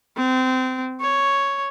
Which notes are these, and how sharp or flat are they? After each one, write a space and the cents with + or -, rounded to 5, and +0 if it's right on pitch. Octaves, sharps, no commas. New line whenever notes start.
C4 -25
C#5 +0